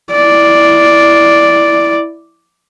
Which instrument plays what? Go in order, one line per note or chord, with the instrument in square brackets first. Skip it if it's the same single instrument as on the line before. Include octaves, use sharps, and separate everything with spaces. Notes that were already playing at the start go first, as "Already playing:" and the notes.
[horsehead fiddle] E4 D5